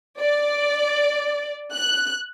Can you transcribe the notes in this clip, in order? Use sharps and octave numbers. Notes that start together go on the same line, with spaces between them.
D5
F#6